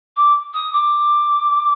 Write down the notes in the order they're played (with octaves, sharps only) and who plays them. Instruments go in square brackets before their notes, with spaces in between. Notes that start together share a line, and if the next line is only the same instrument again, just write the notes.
[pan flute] D6
D#6
D6